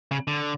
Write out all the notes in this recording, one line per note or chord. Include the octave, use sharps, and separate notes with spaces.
C#3
D3